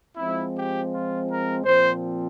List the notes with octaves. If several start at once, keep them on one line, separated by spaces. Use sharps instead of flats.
F3 G#3 C4 E4
G4
F4
A#4
A#2 F3 C4 C5